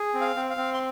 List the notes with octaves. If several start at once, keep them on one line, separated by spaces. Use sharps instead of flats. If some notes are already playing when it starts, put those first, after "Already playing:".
Already playing: G#4
C4
F5
C4
F5
C4
C6